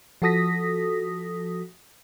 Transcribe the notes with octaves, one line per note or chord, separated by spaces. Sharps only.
F3 F#4 A4 D#6 A#6 B6